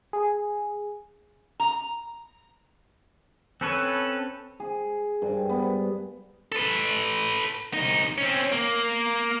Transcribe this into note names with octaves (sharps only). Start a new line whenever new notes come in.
G#4
A#5
C4 C#4 A4 B4 C#5
G#4
G2
B3
A4 B4
C2 D#4
C4 C#4
A#3